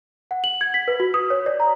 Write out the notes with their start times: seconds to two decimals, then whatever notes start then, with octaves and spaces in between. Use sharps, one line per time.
0.31 F#5
0.44 F#7
0.61 G#6
0.74 B6
0.88 B4
1.00 F#4
1.14 D#6
1.30 C#5
1.46 D5
1.60 A#5